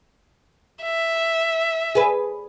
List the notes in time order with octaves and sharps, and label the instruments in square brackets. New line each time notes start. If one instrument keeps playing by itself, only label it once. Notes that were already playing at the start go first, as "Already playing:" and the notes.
[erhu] E5
[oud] G#4 B4